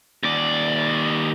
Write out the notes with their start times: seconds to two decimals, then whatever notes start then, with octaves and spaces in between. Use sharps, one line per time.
0.23 D#2 D5